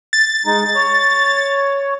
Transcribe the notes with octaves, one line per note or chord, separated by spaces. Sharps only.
A6
G#3 D#4
C#5